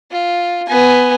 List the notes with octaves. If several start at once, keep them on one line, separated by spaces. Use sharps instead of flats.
F4
B3 G#5